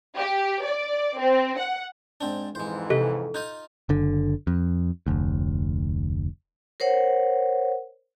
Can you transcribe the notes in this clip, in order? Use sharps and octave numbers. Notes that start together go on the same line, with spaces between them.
G4
D5
C4
F#5
G#2 C4 D4
F2 G#2 E3 G#3 C5
C3 A4 D#5 F#6
D#4 F4 D#5 F#6 G6
F#1 D3
F2
F1 D2
A#4 C5 C#5 F#5